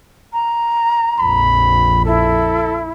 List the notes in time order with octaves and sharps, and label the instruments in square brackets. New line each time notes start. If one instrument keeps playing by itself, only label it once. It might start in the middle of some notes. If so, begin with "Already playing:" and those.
[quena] A#5
[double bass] A#1 F2 [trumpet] B5
[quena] E4 [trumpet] A4